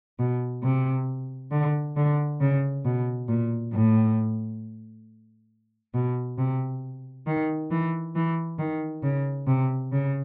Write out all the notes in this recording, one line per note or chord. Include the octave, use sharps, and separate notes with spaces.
B2
C3
D3
D3
C#3
B2
A#2
A2
B2
C3
D#3
E3
E3
D#3
C#3
C3
C#3